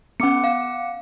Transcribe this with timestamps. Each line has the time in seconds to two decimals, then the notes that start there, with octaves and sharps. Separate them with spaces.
0.20 B3 C#4 F#5 D6 C#7
0.44 F5